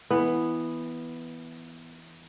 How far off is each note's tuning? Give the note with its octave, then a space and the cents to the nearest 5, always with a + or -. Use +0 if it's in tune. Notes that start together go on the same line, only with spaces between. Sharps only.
E3 +0 B3 +0